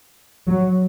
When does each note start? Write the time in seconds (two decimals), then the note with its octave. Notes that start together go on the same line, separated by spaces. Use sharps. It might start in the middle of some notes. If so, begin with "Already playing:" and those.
0.47 F#3